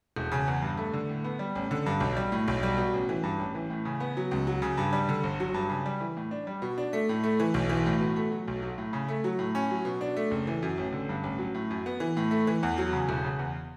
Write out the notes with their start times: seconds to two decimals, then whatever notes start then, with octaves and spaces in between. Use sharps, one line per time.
0.16 E1
0.32 C#3
0.48 E2
0.62 G2
0.77 A3
0.93 D3
1.09 A2
1.24 B3
1.39 G3
1.55 A1
1.71 D3
1.86 G2
2.00 B1
2.17 G3
2.32 A2
2.48 B1
2.63 G3
2.77 B2
2.94 A1
3.09 E3
3.23 G2
3.39 A1
3.55 E3
3.70 A2
3.85 C#3
4.00 B3
4.17 F#3
4.31 C#2
4.47 F#3
4.62 C#3
4.77 G2
4.93 G3
5.09 D3
5.23 G1
5.40 F#3
5.54 G2
5.70 C#3
5.86 G3
6.00 E3
6.17 A2
6.31 D4
6.47 G3
6.62 B2
6.78 D4
6.93 A3
7.09 A2
7.23 A3
7.40 E3
7.54 B1
7.69 E3
7.86 A2
8.00 B2
8.16 A3
8.31 F#3
8.48 B1
8.62 F#3
8.78 A2
8.93 C#3
9.08 A3
9.24 F#3
9.39 A2
9.55 C#4
9.71 F#3
9.85 B2
10.01 D4
10.16 A3
10.31 F#1
10.47 E3
10.63 F#2
10.78 A1
10.92 D3
11.09 G2
11.23 A1
11.39 F#3
11.54 A2
11.70 F#2
11.86 B3
12.00 E3
12.17 A2
12.31 A3
12.47 E3
12.63 E2
12.78 F#3
12.93 C#3
13.09 E1
13.24 C#3
13.39 E2